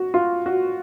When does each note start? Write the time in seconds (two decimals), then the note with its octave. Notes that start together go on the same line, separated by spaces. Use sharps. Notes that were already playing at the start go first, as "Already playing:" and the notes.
Already playing: F#4
0.14 F4
0.46 F#4